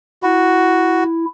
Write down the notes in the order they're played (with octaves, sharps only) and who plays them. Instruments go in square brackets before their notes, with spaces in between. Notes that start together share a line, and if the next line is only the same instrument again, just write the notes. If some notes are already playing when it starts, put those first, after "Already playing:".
[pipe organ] E4 [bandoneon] F#4